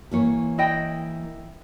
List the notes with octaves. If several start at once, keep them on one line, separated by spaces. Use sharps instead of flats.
E3 A#3 C#5
E4 D#5 G5